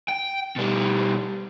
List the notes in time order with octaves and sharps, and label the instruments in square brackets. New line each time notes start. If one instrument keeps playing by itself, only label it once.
[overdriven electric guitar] G5
B2 G3